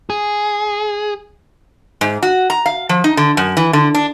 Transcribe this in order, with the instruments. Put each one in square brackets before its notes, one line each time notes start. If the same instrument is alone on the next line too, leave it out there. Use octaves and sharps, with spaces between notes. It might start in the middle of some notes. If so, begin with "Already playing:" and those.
[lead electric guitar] G#4
[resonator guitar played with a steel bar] G#2
F#4
A#5
F5
F3
D#4
D3
F#2
E3
D3
D4